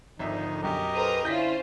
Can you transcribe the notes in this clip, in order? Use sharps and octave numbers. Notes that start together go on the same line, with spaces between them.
G#1 D3 D#3 F3 D#4 E5
B1 F#2 G4 A#4 D#5
A4 B4 C5 A#5 D#6
D3 C#4 E4 F4 C5 G6 A#6 B6